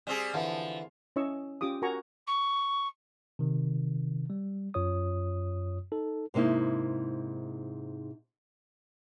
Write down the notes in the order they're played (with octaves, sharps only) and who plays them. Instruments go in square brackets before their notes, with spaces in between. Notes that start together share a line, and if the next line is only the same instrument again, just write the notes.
[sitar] G3 C4 G#4
[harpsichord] D3 E3 [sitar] F3
[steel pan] C#4 E4 C#5 D#5 C#6 E6
C#4 F4 G4 D6 D#6
F#4 A#4 G#5 A#5 C#6
[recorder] C#6
[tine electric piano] C3 D#3
G3
F#2 F4 C#5 D#6
D#4 A4
[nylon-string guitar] G#2 C3 A#3 D#4 E4